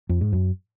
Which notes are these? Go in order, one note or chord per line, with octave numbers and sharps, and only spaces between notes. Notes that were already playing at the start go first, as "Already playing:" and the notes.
F2
G#2
F#2